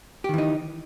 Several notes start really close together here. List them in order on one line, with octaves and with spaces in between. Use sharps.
G4 D#3 E3 D#4